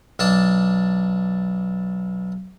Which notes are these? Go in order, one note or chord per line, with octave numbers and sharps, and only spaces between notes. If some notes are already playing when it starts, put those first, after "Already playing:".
B1 D4 A5